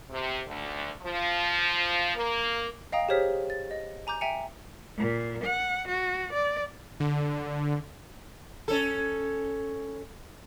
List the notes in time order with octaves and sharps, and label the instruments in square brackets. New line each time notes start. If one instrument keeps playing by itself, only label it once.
[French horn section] C3
D2
F3
A#3
[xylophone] D#5 F5 G5 A#5 D#6
G4 G#4 C5 C#5 F6 B6
A6
D#5
G#5 A#5 D6 G6
E5 G5 G#5 A#5 C#7
[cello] A#2
F#5
F#4
D5
[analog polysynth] D3
[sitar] C#4 A4